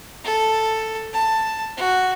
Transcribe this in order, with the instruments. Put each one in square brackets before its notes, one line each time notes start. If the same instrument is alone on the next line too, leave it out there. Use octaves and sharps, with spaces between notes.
[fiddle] A4
A5
F#4